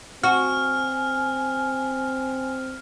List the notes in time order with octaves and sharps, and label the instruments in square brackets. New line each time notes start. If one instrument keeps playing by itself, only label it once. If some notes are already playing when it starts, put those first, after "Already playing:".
[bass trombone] C4 [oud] F#4 [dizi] G#5 [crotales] F6